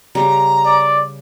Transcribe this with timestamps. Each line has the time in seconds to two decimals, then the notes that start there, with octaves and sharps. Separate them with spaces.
0.15 C#3 G3 A#5
0.65 D5